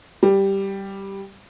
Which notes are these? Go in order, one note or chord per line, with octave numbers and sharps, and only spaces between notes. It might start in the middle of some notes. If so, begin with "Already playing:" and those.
G3